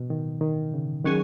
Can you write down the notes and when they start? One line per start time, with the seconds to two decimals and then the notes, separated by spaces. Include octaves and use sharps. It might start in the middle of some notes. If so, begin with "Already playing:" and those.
Already playing: B2
0.10 D#3
0.41 D#3
0.74 C#3
1.05 D#3 F#3 C#4 G#4